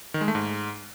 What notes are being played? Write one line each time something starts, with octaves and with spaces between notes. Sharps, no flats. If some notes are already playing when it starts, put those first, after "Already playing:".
D#3
G#3
A3
G#2